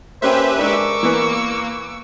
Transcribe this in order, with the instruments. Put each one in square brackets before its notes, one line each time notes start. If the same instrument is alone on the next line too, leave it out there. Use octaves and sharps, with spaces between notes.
[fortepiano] A#3 C#4 G5 [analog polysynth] G4 B4 E5 [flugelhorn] C5
[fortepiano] G#3 D4 D#4 [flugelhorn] A#4 [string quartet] C#6 D6 E6
[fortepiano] E3 B3 B4 [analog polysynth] A#3